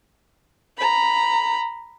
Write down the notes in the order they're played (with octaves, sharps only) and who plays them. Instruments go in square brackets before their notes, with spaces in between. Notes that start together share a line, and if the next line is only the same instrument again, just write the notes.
[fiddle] A#5 B5